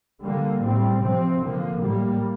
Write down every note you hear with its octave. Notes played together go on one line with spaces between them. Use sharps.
D3 G3 A#3
A2 G3 C4
C3 F3 C4
D3 F3 A#3
A2 G3 A#3